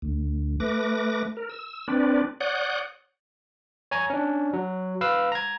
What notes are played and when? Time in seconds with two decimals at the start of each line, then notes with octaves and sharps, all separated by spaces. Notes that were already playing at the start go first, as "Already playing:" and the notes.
0.02 D2
0.60 A3 B4 D6 A#6
1.37 A#4
1.50 E6
1.88 C4 D4 B4 D5
2.40 C#5 D5 F#5 D#6 F#6 G6
3.91 C#5 G#5 A#5 G#6
4.10 C#4 D4
4.53 F#3
5.01 B4 F5 E6
5.32 A#5 G#6